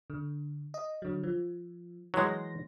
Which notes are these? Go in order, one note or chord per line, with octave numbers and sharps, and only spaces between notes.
D3
D#5
D3 F#3
F3
E3 F#3 G#3 C6 A#6